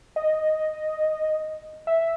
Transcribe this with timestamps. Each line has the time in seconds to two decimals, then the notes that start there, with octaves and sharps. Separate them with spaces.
0.16 D#5
1.87 E5